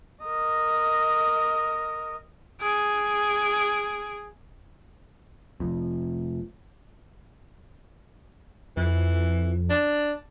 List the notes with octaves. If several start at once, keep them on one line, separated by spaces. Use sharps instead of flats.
A#4 D#5
G#4 D7
F1 F2
F2 E3
D4